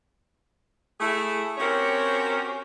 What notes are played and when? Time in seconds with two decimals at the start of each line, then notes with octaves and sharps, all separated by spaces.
1.01 A3 E4 G#4
1.58 C4 C#4 F#4 G4 A#4 C#5